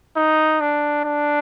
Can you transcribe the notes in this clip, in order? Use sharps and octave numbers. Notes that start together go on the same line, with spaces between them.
D#4
D4
D4